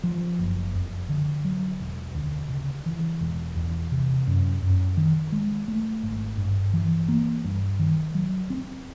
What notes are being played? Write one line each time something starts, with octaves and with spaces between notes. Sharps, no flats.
F3
F#1
F2
D3
F#3
E1
D2
C#3
E3
E1
E2
C3
F#2
F#2
D#3
G#3
A3
G#1
G2
E3
A#3
G2
D#3
F#3
C4